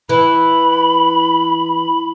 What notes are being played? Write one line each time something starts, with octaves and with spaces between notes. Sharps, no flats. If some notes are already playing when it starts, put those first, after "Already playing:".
E3 B5